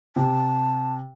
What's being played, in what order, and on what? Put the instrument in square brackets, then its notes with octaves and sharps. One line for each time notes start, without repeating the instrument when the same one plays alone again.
[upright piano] C3 [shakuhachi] A5